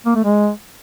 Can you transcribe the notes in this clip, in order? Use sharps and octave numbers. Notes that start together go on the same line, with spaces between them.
A#3
A3
G#3